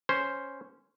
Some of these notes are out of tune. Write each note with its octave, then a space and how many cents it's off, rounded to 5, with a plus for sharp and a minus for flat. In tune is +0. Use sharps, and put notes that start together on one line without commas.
C#4 +0 C5 +0